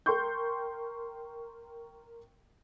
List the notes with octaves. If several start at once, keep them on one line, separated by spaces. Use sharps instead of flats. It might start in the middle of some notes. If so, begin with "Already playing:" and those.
A#4 G5 C6 C#6 G6